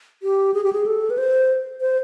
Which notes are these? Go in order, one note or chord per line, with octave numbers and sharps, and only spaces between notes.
G4
G#4
G4
G#4
A4
B4
C5
C5